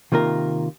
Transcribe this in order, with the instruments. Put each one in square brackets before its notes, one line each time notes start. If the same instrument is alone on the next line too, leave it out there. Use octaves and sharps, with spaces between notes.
[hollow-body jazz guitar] C3 D#3 A#3 F4 A#4